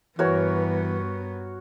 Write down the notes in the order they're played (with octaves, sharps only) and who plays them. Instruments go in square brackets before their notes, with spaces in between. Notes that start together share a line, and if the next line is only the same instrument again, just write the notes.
[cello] G2 B3 [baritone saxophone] E3 [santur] F#4 A#4 C#5